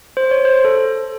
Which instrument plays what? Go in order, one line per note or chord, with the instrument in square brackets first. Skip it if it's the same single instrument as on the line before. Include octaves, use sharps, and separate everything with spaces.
[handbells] C5
C#5
C5
A4